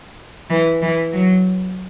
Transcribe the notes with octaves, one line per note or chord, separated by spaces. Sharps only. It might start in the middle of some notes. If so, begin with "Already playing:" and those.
E3
E3
F#3